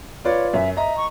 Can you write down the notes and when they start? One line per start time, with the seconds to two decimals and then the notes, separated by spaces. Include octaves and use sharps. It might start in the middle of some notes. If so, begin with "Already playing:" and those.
0.25 F4 B4 C#5 D5
0.54 F#2 E5
0.77 D#5 E5 A#5
0.97 C#6